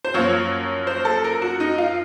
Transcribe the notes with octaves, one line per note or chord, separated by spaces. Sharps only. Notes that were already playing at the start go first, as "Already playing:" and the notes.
C5
F#2 F3 A#3 C#5
C5
A4
A#4
F#4
D#4
F4